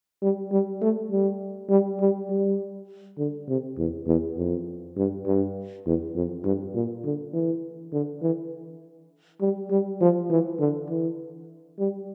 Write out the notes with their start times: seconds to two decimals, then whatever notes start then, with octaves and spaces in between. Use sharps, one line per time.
0.22 G3
0.52 G3
0.81 A3
1.11 G3
1.69 G3
2.00 G3
2.29 G3
3.18 D3
3.48 C3
3.78 E2
4.07 E2
4.37 F2
4.97 G2
5.26 G2
5.86 E2
6.15 F2
6.44 G2
6.75 A#2
7.04 D3
7.33 E3
7.92 D3
8.22 E3
9.41 G3
9.70 G3
10.01 F3
10.30 E3
10.60 D3
10.90 E3
11.79 G3